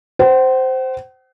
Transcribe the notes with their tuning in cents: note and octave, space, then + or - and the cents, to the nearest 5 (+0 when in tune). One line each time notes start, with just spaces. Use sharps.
C5 -5 F#5 +45